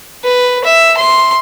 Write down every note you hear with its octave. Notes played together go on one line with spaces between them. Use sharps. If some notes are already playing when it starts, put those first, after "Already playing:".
B4
E5
C6